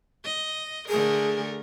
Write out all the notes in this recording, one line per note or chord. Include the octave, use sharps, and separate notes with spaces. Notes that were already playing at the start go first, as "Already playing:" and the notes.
D#5
D3 A3 G#4 A#4